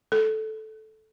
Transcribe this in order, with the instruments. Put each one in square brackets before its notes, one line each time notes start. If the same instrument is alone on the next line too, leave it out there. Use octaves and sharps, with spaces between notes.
[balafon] A4